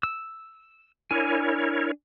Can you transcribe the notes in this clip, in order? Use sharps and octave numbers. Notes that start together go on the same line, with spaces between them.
E6
D4 E4 A#4 C#5 G#5